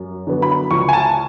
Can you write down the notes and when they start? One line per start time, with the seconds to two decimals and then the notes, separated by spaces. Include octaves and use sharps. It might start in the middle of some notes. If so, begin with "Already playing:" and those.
Already playing: F#2
0.27 D3 F#3 B3
0.42 B5
0.71 C#2 C#6
0.89 G#5
0.93 A5